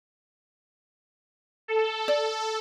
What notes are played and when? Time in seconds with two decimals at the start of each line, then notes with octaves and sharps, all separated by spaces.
1.68 A4
2.08 D5